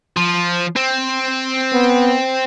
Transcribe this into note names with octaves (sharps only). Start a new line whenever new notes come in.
F3
C4
B3